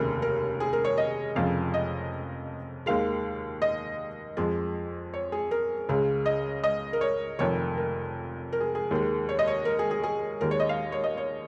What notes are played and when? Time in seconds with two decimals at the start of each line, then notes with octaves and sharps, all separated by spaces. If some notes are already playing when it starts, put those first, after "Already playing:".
Already playing: F1 D#2 C#3 A#4
0.22 A#4
0.60 G#4
0.73 A#4
0.85 C#5
0.98 D#5
1.35 F1 F2 C#3 F3 F5
1.74 D#5
2.86 D#2 D#3 G#3 F5
3.62 D#5
4.37 F2 F3 G#3
5.14 C#5
5.32 G#4
5.51 A#4
5.89 C#2 C#3 G#3
6.26 D#5
6.64 D#5
6.93 A#4
7.01 C#5
7.39 F1 F2 D#3 C#5
7.77 A#4
8.53 A#4
8.60 G#4
8.75 G#4
8.91 D#2 D#3 G#3
9.29 C#5
9.39 D#5
9.48 C#5
9.65 A#4
9.79 G#4
9.91 G#4
10.03 G#4
10.41 D#2 D#3 G#3 A#4
10.51 C#5
10.60 D#5
10.69 F5
10.92 C#5
11.04 D#5
11.17 C#5